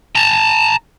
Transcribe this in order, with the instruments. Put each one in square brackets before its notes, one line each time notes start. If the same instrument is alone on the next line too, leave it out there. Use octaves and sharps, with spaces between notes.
[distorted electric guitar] A5 A#5